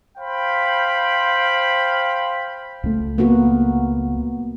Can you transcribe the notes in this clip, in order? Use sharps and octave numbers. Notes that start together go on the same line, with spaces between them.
C5 F5 G5 B5
C#2 A3
A#3 B3 F#4